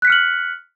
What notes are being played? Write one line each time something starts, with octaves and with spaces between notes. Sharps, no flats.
F6 F#6 B6 C#7 F#7